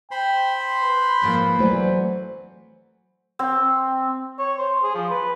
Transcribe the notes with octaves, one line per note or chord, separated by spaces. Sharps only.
C5 G5 B5 C6
B4
G#2 F3 A#3
E3 F#3 A3 C5 D5
C4
C#5
C5
G#4
F3
B4